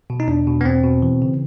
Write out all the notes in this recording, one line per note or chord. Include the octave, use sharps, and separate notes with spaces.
B2
D#4
E2 D4
B2
B3
E2 C4
B2
E3
C#3